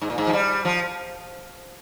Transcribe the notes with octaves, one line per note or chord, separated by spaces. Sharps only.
G#2
A#2
G#2
F3
G3
F3